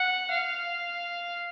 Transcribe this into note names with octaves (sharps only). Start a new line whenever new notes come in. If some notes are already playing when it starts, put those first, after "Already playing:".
Already playing: F#5
F5